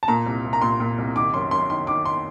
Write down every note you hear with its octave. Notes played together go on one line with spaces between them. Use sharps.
A5
A#2 A#5
C2
C2
A#5
A#2 C6
A#2
C2
D#3 D6
F#2 C6
F#2 C6
D#3 C6
D#3 D6
C6